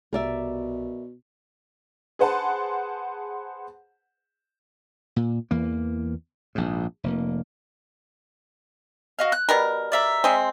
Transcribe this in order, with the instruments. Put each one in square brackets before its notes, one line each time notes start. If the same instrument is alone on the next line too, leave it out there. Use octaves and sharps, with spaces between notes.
[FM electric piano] C2 [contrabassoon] B2 [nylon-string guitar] A#4 D5 E5
[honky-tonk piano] G#4 B4 C5 F#5 A5 C6
[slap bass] A#2
E2 E3 A#3
A#1 G#2
F1 A#3
[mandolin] F#4 D#5 F5
F#6
[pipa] B2 G3 A#4
[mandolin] D5 E5 A#5
[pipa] G#3 C4